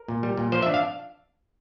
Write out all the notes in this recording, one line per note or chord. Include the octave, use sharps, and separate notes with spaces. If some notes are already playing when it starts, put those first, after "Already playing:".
Already playing: A#4
A#2
G3
A#2
F3 C5
E5
D4
F5